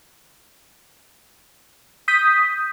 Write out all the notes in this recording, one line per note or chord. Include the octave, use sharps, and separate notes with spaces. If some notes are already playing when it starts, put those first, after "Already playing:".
D#6 G6 B6